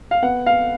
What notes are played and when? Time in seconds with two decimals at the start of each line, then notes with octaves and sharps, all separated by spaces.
0.11 F5
0.22 B3 F#5
0.46 F5